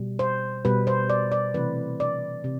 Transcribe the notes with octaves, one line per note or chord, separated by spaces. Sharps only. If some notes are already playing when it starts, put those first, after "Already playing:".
Already playing: B2 G3
C5
B2 G3 B4
C5
D5
D5
C3 E3 A3 B4
D5
C3